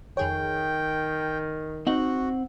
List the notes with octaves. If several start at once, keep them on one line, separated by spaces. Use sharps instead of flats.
F2 D#3 G#4 C#5 G5
C4 D#4 F#4 F#5